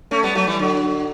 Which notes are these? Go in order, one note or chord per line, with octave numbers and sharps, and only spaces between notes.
A3 C#4
G3 B3
F#3 A3
E3 G3
D3 F#3